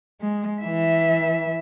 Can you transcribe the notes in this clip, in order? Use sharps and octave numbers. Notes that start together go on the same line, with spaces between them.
G#3
E3 E5